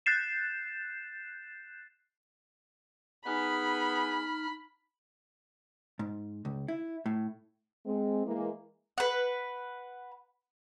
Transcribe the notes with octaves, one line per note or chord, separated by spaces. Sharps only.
F#6 G6 A6 C7 E7
B3 D#4 G#4 B5 F6
G#2
C#2
E4
A2
G#3 C4
E3 G#3 A#3
B4 F#5